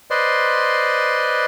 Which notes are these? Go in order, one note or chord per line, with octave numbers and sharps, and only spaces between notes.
B4 C5 D5 D#5 C6